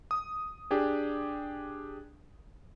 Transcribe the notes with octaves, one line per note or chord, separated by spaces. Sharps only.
D#6
D4 G4 G#4